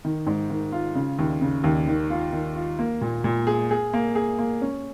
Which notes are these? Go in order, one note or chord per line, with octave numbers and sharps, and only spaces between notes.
D#3
G#2
D#3
F4
C#3
D#2
C#3
D#2
D#3
F4
D#3
F4
A#3
A#2
A#2
G#4
G#4
A#3
G#4
A#3
C#4